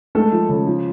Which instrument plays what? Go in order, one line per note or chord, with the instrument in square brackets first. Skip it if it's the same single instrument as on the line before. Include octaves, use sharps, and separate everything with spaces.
[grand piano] G#3 [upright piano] A3 A4
[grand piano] F3
C#3
F3